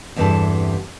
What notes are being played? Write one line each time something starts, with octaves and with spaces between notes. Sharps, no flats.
E2 G2 C3 E3 A4 A5